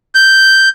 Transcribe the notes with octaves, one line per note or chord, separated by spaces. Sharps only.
G6